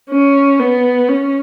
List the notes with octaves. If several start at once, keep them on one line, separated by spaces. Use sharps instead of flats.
C#4
B3
C#4